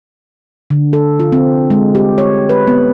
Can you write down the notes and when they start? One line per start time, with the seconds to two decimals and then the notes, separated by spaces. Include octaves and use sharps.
0.70 D3
0.93 A4
1.20 F4
1.32 C4
1.70 G#3
1.95 G4
2.18 C#5
2.49 B4
2.67 B3